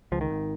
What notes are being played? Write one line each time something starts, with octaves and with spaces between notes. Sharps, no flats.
C#2 F3
D#3
G#1